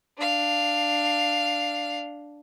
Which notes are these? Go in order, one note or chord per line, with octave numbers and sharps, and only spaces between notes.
D4 F5